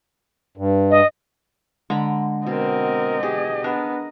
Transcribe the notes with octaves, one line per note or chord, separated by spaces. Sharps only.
G2
D#5
D3 G#3 A#5 B5
B2 C4 A#4 D#5
G4 G#4
B3 D4 A#4